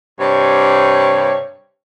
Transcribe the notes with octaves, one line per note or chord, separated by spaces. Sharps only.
G2 C3 C#5